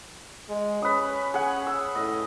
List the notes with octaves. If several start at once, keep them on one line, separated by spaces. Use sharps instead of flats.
G#3
C#4 B4 D#6
G#4 F#5
E6
A2 D#5